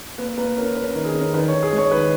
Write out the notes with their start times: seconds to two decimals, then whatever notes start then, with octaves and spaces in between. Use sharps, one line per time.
0.18 A#3 B4
0.37 A#3 B4
0.57 C#4 A#4
0.76 C#4 B4
0.91 A#4
0.95 D#3
1.05 G#4
1.14 C#4
1.20 A#4
1.34 D#3 B4
1.48 C#5
1.53 D#3
1.63 G#4
1.73 G#3
1.78 C#5
1.91 D#3 B4